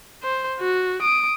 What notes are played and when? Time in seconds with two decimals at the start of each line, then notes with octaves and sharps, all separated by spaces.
0.23 C5
0.60 F#4
1.02 D#6 D7